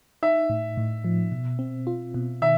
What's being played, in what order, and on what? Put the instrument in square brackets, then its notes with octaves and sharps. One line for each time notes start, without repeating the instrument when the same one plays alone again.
[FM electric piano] D#4 [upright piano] E5
[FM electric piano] A2
A2
F3
B2
C4
F4
B2
[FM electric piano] D#3 [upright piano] E5